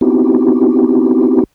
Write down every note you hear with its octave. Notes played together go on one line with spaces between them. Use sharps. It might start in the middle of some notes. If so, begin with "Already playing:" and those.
B3 C4 D#4 E4 F#4 G4